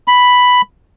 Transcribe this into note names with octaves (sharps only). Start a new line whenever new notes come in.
B5